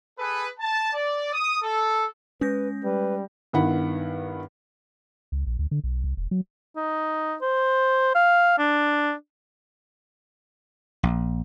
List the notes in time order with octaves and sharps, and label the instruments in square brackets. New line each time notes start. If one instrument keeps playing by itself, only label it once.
[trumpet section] G#4 A4 B4
A5
D5
D#6
A4
[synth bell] G#3 G6 A#6 [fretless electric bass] C#4 [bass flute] B4
[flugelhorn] G3 [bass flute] B4
[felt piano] G2 D#3 B3 E4 F#5 B5
[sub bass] C#2
A#1
D2
D3
B1
C2
E1
F#3
[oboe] D#4
C5
F5
D4
[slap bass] A#1